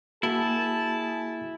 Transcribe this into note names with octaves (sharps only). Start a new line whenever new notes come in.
A#3 E4 F#4 G#4 A5